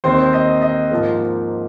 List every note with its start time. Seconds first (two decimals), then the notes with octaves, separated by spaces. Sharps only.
0.04 D#2 D#3 C4 C5
0.33 D#5
0.62 D#5
0.91 G#2 F3 A#3